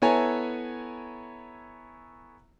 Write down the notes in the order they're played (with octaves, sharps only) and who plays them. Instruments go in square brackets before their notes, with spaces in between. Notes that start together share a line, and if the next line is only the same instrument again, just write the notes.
[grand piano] B3 E4 A4 C#5 G#5 A#5